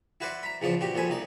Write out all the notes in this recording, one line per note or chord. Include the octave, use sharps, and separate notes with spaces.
E4 F#4 B4 C5 D5 F#5
A#5 B5
E2 C#3 F3 A5 C6 D6
A#2 F#4 G4
D#2 F3 A4 G#5 B5
C2 D#4 D5